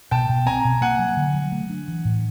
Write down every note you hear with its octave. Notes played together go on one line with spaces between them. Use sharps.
B2 G5 A5
B2
C4 G#5 A#5
B2
A#3 F#5 G#5
F#3
D3
F#3
A3
D4
E3
A2